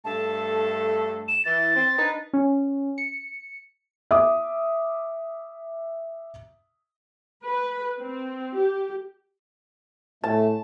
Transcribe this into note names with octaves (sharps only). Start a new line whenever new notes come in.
G2 A3 A4 A5
E7
E3 A6
C4
D4 D#4 B4
C#4
C#7
E5 D6 D#6
B4
C4
G4
A2 A3 A5